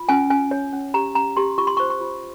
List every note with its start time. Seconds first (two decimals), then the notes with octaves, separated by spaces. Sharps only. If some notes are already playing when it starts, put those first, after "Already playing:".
Already playing: F4
0.09 C#4 G#5
0.30 C#4 G#5
0.51 C#5
0.73 C#4
0.94 G4 A#5
1.15 C#4 A#5
1.37 G4 C6
1.58 F4 C#6
1.67 C6
1.77 C#6
1.80 C5
1.90 C#6
2.01 F4